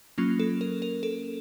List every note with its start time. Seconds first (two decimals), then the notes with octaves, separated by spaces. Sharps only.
0.18 F#3 A#3 C#4 F4
0.40 A4
0.61 A#4
0.82 A#4
1.03 A4